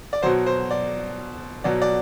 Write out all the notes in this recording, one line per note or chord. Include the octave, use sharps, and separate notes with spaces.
D5
B2 F#3 C5
C5
D5
B2 F#3 D5
D5